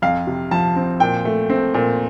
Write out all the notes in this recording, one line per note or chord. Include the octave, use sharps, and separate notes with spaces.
F2 F5
C3
F3 A5
C4
A#2 G5
A3
C4
A#2